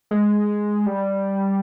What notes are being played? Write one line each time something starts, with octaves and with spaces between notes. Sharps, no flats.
G#3
G3